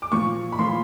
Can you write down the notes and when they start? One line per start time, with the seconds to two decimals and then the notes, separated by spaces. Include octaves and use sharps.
0.02 D6
0.11 A#2 F3 A#3 C#6
0.52 B5
0.59 A#2 F3 A#3 C6